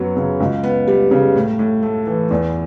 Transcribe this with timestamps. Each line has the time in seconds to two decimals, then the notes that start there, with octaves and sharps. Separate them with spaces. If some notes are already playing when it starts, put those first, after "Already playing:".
Already playing: F#2 F#3 B3
0.16 C#3
0.40 C#2
0.63 B3
0.88 G3
1.11 C#3
1.36 A2
1.59 A2
1.83 A3
2.07 E3
2.31 E2